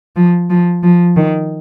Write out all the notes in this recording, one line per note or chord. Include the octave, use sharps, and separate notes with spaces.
F3
F3
F3
D#3